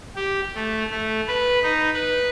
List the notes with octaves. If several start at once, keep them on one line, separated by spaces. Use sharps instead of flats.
G4
A3
A3
B4
D#4
B4